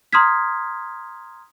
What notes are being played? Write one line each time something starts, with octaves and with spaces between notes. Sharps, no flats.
A#5 C6 D#6 F6 G#6 B6